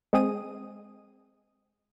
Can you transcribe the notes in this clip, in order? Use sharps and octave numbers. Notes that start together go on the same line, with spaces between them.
G#3 C4 G#4 D#6 D#7